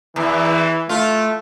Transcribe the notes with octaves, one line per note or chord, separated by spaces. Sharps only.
E2 E3
A3 F4